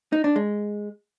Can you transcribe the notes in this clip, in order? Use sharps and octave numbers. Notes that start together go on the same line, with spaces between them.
D#4
D4
G#3